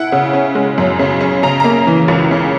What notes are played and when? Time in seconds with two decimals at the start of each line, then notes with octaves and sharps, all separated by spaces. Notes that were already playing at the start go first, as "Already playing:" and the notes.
Already playing: E4 F#5
0.12 C#3
0.33 C#4
0.55 G#3
0.78 F#2
0.99 C#3
1.21 C#4
1.43 C#3 A#5
1.60 A#3 A#5
1.87 E3
2.08 C#2
2.31 C#3